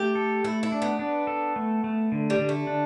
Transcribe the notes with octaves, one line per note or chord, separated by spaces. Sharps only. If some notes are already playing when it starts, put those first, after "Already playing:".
Already playing: A3 G4
A4
A3 E4
E4
D4
B3
D4
A4
A3
A3
D3
G3
D3
A3
D4